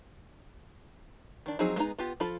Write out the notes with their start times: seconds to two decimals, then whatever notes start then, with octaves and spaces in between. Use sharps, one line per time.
1.46 D#3 D4
1.59 F3 F#3 C4 D#4 G#4
1.76 F#3 G#3 B3 D#4 A#5
1.99 B3 F4 G4
2.20 F3 F4 A4 B5